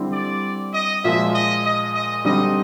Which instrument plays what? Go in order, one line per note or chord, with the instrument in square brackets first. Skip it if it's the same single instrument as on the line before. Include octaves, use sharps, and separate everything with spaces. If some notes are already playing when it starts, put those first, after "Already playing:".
Already playing: [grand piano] D3 G3 C4 E4
[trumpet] D5
D#5
[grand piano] A#2 F3 G#3 [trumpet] E5
[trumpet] D#5
D#5
D#5
[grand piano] D3 G3 C4 D#4 [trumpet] D#5